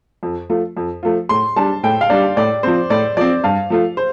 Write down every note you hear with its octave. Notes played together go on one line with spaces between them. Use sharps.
F2
F3 A3 F4
F2
F3 A3 F4
A2 C6
G3 D4 A5
A2 G5
F5
G3 D4 D5
A2 D5
F3 C4 C5
A2 D5
F3 C4 D5
G2 F5
F3 A3 F4
C5